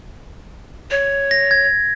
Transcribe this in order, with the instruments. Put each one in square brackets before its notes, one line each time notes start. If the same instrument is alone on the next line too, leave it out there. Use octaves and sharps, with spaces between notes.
[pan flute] C#5
[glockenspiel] A#6
G#6